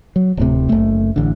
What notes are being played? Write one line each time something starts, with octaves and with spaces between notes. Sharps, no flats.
F#3
D1 A2 C3
F#1 A3
A1 D3